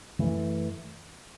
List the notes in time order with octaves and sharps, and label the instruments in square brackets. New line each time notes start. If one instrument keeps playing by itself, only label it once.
[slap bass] F#2 E3 A3